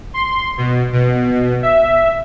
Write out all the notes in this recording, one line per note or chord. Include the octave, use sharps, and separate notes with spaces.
C6
B2
B2
E5